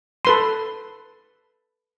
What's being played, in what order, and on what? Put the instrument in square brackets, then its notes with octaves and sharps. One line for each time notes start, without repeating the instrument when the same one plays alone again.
[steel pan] A4 B4 C6